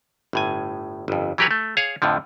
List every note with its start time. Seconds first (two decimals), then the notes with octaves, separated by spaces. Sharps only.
0.33 G1 A2 G#5
1.08 G1 F2
1.38 E3 F#3 G4 A#4 B4 C#5
1.51 A3
1.77 G#4 C#5 F5
2.02 F2 A2 D3 F3